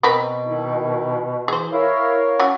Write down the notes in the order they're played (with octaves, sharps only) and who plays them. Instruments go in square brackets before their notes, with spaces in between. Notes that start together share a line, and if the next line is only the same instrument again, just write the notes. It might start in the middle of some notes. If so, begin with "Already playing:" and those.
[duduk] B2 [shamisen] C4 A#4 B4
[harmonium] D#3 D#4 E4
[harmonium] E3 [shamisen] G#4 C5
[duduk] E4 [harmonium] A#4 C#5 F5
[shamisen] F#3 G#5 [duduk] C#4